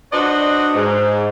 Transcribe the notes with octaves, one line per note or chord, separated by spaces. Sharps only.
D4 F#4 B4 C5 D5 D#5
G#2